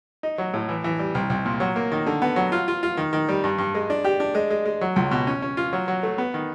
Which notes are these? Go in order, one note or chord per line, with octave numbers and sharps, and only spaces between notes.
D#4
F#3
A2
E3
E3
G3
C2
C2
A#2
F#3
A#3
D#3
D3
B3
F#3
F4
F4
F4
D#3
D#3
G3
G2
G2
G#3
D4
G4
D4
G#3
G#3
G#3
F#3
C#2
B2
C#4
C#4
F4
F#3
F#3
A3
B3
D#3